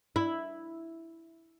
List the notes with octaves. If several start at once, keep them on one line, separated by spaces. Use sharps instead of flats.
E4